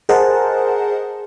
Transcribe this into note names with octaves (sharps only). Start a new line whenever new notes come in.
G#4 A#4 C5 D#5 F#5 A5